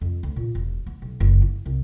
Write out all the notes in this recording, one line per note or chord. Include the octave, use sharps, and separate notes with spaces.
F2
D2
A#2
E1
B3
B1
F#1
E4
C2